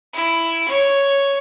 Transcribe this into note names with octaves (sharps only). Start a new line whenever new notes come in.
E4
C#5